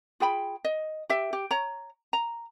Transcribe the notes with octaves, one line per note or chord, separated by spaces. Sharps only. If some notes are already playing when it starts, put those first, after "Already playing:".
F4 G#4 G5 B5
D#5
G4 E5
G4
C#5 A#5
A#5